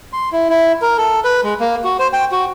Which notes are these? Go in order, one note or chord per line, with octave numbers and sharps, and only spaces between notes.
C6
E4
E4
A#4
A4
B4
G#3
A#3
F#4
C5
G5
F#4